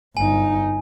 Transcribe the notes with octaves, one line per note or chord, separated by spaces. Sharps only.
G1 D#4 G#5